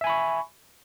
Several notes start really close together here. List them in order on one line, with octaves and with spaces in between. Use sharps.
E5 G#5 B5 C#6